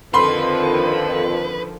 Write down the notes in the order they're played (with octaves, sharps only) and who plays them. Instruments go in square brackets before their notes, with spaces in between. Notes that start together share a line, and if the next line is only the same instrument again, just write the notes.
[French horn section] F2 [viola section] D3 D#3 F3 [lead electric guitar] B4 [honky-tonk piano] B5 C6